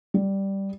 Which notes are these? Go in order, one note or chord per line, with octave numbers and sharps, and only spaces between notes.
G3